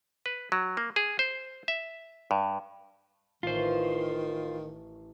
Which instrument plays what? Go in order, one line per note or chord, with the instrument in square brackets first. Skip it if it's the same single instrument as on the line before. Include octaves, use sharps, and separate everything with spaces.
[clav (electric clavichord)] B4
F#3
A#3
G#4
C5
E5
G2
[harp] A1 C#4 [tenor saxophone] D#3 [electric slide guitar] F4 C5